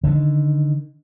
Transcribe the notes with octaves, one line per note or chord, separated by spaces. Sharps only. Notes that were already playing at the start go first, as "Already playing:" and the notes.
D3 D#3